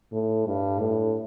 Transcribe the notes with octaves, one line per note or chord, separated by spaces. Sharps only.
A2
G2
A2